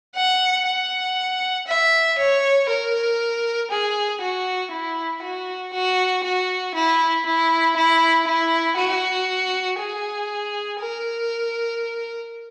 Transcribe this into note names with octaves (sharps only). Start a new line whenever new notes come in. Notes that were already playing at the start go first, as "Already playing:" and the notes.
F#5
F#5
E5
C#5
A#4
G#4
F#4
E4
F#4
F#4
F#4
E4
E4
E4
E4
F#4
G#4
A#4